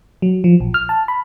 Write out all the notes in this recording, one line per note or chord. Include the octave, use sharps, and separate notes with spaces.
F#3
F3
A#1
F6
A5
B5